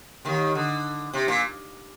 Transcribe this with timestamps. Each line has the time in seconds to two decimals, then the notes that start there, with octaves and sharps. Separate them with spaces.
0.25 D#2 D#3
0.55 D3
1.14 C3
1.28 A#2